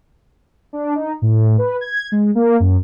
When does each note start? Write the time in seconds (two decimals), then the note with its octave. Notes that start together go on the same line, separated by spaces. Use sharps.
0.73 D4
0.95 D#4
1.22 A2
1.58 B4
1.81 G#6
2.12 G#3
2.35 A#3
2.60 F#2